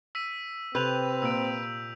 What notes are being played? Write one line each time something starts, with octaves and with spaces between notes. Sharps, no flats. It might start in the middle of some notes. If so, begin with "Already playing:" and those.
E6 B6 D#7
C3 C4 B4 G6 F7
A#2 E6 D7